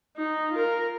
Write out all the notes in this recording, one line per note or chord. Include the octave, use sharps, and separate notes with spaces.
D#4
F4 A#4